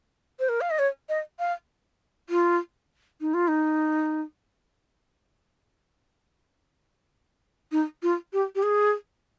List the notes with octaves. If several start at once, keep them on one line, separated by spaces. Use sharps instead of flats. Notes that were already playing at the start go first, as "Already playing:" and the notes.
C5
A#4
F5
D#5
C#5
D#5
F5
F4
D#4
F4
D#4
D#4
F4
G4
G4
G#4